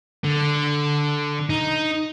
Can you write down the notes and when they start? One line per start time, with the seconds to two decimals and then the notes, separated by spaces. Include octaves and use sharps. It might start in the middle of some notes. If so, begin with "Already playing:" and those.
0.24 D3
1.50 D#4